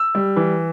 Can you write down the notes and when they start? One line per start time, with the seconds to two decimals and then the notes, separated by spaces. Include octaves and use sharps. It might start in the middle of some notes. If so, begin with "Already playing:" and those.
Already playing: E6
0.15 G3
0.36 E3